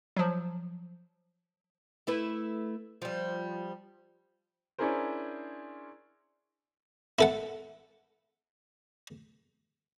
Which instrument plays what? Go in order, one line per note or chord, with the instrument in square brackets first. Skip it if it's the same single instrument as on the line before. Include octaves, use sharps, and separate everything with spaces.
[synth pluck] F3 F#3
[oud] A3 E4 B4
F3 G3
[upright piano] C#4 D4 E4 G#4 A#4 C5
[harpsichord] E4 A4 F#5